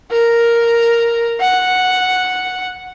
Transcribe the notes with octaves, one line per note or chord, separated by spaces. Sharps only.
A#4
F#5